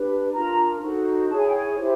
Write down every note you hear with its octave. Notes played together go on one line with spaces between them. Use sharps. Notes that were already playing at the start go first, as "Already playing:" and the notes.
Already playing: D4 G4 B4
D4 F4 A#4 A#5
D#4 F#4 A4 C5
E4 G#4 C#5 A5
G#5
G5
G#5
E4 G4 C5